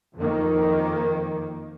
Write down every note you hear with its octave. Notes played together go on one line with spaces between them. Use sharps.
F2 D#3 A#3